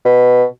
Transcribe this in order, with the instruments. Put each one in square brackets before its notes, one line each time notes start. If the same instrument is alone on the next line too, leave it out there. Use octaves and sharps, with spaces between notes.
[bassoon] B2